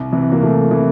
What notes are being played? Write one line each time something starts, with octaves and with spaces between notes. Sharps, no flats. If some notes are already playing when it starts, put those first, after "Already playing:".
Already playing: C2
C3 E3
A#3
C2 A3
C3 E3